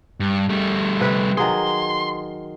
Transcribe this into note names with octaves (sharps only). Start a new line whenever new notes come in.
G2
G3 A3
C3 B4
D#3 F#3 G#4 C6